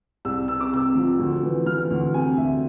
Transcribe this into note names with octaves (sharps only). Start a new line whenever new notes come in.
C2 E6
C3 E6
D6
C3 E6
F3
D2
E3
E3 F6
D2
C3 G#5
D2 E5